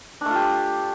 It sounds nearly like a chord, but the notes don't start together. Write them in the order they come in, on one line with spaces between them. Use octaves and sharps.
D4 A3 F4 G4